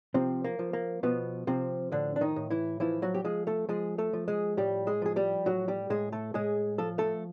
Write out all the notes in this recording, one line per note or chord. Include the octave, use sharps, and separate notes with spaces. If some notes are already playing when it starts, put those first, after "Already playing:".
C3 F3 C4
A#3
F3
A#3
B2 F3 B3
C3 F3 C4
A2 D3 D4
D4
D#3 D#4
A2
E3 E4
E3 F3 E4
F#3 F#4
G4
F3 G#3 G#4
A3 A4
F3 G#3 G#4
A3 A4
F3
G#3 G#4
A2 G3 G4
G#3 G#4
F3 G#4
G3 G4
A2 F#3 F#4
G3 G4
A2 G#3 G#4
A3 A4
A2 G#3 G#4
F3 A4
A3 A4